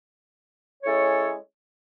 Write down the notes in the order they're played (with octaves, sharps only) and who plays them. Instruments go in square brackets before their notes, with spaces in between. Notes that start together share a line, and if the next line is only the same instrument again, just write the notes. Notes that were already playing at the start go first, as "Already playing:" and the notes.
[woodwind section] G#3 C#4 E4 A4 C#5